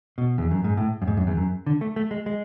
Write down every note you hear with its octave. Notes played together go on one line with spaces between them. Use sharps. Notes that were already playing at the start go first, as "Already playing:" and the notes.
B2
E2
F#2
G#2
A2
F#2
G#2
F#2
E2
F#2
D3
A3
A3
G#3
G#3